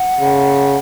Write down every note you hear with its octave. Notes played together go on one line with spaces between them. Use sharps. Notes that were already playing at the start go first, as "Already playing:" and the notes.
Already playing: F#5
C#3